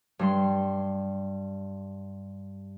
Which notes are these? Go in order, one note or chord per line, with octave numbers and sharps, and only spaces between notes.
G2 G3 C6